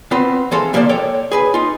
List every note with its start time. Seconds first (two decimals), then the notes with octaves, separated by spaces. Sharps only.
0.11 B3 C4 F4 B4 C5
0.51 E3 G#3 A4 C5 F5 G#5
0.73 D3 F3 A#3 B3 C5 D5
0.89 A4 C#5 D5 G5
1.32 G#4 B4 G#5
1.54 D#4 F4